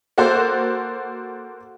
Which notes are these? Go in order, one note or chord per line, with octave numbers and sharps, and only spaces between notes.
A#3 F#4 A4 C5